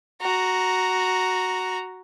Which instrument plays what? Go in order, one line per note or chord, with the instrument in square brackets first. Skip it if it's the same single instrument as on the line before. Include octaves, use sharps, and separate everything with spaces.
[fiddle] F#4 A#5